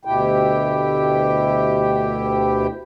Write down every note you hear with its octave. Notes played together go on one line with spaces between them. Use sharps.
D2 B2 E4 G4 G5